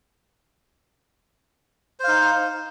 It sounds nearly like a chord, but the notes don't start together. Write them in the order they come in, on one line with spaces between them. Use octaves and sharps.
C5 F5 D#4